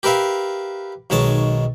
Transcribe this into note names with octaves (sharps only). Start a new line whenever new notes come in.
G4 A#4 B4 E5 F5
B1 D#3 G#3 C#5 A5